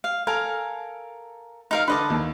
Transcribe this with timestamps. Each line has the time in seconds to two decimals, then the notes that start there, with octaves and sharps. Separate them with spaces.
0.04 F5
0.27 A4 A#4 F5 G#5
1.71 D#4 A#4 F5
1.88 D3 B4 D#5 A5 C6 D6
2.10 D#2